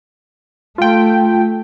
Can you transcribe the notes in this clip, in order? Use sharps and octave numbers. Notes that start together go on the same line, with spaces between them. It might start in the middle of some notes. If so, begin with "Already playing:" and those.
A3 F4 G5